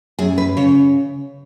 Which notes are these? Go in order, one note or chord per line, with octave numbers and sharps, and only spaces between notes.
F#2 G#4
B4
C#3 C#5